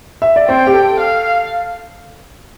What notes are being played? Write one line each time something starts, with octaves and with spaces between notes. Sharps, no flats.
E5
D5
C4 C5 G5
G4
A4
F5